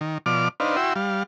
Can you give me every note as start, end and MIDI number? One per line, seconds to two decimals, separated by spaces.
0.01 0.18 51
0.26 0.48 47
0.26 0.48 53
0.26 0.48 74
0.26 0.48 86
0.26 0.48 89
0.60 0.76 62
0.60 0.76 63
0.60 0.76 71
0.60 0.76 72
0.60 0.76 77
0.77 0.93 64
0.77 0.93 66
0.77 0.93 79
0.77 0.93 84
0.77 0.93 88
0.96 1.23 55
0.96 1.23 77